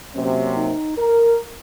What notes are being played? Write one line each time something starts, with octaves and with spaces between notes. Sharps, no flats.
C3 F#3 A#3 C#4
D#4
A#4